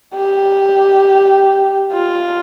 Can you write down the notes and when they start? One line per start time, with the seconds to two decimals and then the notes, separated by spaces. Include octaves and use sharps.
0.15 G4
1.93 F4